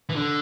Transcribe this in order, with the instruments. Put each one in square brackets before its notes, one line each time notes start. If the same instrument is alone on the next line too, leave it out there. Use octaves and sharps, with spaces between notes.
[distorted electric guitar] E3
D3